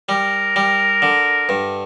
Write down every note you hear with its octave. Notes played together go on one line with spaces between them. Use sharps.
G3 A#4
G3
D3
G2